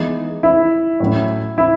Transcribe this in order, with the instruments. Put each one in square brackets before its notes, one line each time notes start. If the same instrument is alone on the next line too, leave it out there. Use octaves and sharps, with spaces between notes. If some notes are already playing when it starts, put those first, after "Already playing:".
Already playing: [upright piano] E3 G#3 B3 D#4
[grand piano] E4
[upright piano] A2 F#3 C#4
[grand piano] E4